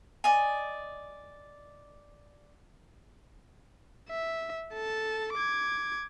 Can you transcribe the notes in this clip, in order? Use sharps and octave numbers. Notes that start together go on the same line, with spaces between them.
D5 D#5 G#5
E5
A4 A5
D6 G#6